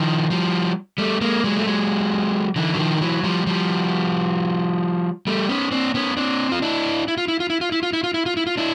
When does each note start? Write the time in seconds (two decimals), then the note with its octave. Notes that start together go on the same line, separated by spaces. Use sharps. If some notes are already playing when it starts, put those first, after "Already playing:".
Already playing: D#3 F3
0.30 F3 G3
0.98 G3 A3
1.21 G#3 A#3
1.44 F#3 G#3
1.56 A3
1.66 F#3 G#3
2.56 D3 E3
2.73 F#3
2.78 D#3 F3
2.97 F3
3.01 E3 F#3
3.24 F3 G3
3.47 F3 G3
5.27 G3 A3
5.49 B3 C#4
5.71 C4 D4
5.95 B3 C#4
6.17 C4 D4
6.52 F4
6.62 D4 E4
7.08 E4
7.17 F4
7.28 E4
7.40 F4
7.50 E4
7.61 F4
7.72 E4
7.83 F4
7.93 E4
8.04 F4
8.14 E4
8.26 F4
8.37 E4
8.47 F4
8.57 D4 E4